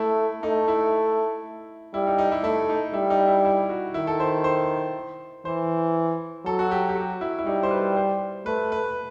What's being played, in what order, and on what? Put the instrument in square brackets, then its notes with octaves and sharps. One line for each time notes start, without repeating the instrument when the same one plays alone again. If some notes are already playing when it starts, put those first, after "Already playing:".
Already playing: [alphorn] A3 [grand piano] E4
[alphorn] A3 [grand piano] D#4
[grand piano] E4
[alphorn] G3 [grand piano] E4
[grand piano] D#4
D#4
E4
[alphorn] A3 [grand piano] E4
[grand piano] D#4
[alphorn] G3 [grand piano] E4
[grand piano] D#4
E4
E4
F#4
[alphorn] D#3 [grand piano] E4
[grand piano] A4
C5
C5
[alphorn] E3 [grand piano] C5
[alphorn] F#3 [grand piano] A4
[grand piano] F#4
G4
G4
F#4
E4
E4
[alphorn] G3 [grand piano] D#4
[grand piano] C5
B4
C5
[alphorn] A3 [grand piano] B4
[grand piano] B4